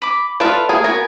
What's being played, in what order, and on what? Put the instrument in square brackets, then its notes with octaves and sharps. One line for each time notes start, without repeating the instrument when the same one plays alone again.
[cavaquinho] B5 D6
[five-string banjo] F4 B4 D5 [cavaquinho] A4 E5 F5
[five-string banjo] A3 A#3 G#4
[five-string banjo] B3 F#4 [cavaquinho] A#4 G#5